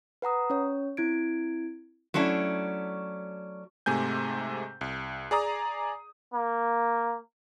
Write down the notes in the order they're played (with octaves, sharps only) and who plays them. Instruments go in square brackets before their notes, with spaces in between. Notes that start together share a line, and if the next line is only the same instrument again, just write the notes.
[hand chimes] B4 F#5 A#5 D#6
C#4 C#5
C4 E4 G#6 D7
[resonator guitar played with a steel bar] F#3 A3 C#4 D4 E4
[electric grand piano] G#2 C3 A3 G#5 G6
C2
G#4 D5 A#5 D#6
[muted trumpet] A#3